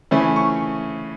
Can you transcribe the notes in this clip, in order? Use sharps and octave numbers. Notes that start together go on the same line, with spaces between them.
C#3 E3 A3 C#4 B5
C#6